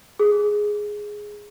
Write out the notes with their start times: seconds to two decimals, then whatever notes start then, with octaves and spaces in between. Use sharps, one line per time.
0.19 G#4